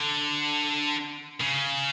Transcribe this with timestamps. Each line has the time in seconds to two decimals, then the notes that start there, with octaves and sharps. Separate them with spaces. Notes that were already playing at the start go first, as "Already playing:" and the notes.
Already playing: D3
1.41 C#3